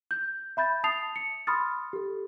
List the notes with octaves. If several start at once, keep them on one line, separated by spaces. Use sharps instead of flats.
G6
E5 B5 G6 A6
A5 D#6 A6 C7 F7
C#7
B5 C6 D#6 F6 A6
G4 A4